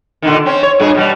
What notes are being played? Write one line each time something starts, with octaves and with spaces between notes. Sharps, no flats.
A#2 D3 D#3
C4 C#4
C#5
G2 A#2 G#4
B2 G3